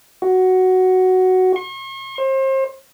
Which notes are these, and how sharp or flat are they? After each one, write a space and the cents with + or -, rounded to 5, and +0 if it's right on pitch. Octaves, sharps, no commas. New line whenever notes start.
F#4 +5
C#6 -45
C5 +35